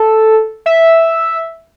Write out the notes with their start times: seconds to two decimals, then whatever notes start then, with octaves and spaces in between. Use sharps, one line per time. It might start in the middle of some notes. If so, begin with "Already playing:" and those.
Already playing: A4
0.66 E5